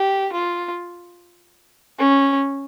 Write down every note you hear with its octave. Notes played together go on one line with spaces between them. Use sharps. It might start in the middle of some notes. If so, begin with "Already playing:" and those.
Already playing: G4
F4
C#4